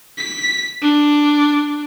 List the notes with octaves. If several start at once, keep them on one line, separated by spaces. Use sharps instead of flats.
B6
D4